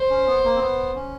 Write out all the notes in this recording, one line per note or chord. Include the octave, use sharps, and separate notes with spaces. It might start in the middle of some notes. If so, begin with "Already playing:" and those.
Already playing: C5
C#4
B3
A#3
C4
B3
C#4